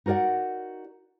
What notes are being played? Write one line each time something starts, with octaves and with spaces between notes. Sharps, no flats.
D#4 F#4 A#4 D5 F#5